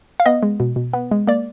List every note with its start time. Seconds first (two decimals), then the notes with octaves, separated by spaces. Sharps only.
0.20 F5
0.26 B3 D#5
0.43 G#3
0.60 B2
0.76 B2
0.93 B3
1.11 G#3
1.27 A#3 D5